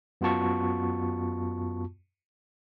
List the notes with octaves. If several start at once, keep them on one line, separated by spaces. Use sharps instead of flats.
F#2 B3 F4 F#4 A5 C#6